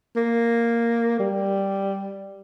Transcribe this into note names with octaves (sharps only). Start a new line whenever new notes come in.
A#3
G3